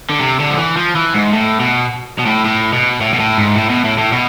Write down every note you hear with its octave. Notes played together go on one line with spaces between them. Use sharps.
D3
C3
D3
F3
E3
F3
E3
G#2
A2
B2
B2
A2
A2
B2
A2
B2
A2
G#2
A2
B2
A2
A2
B2